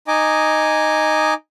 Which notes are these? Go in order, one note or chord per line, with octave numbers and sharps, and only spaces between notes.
D#4 D#5 G#5 D6